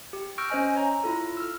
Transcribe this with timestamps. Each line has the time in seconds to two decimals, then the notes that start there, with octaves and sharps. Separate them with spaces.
0.13 G4
0.38 C#6 E6 F6 G6 A#6 D7
0.50 C#4 C5 D#5 G#5
0.76 C#5 A#5
1.04 E4 F4 A4
1.37 E6 F6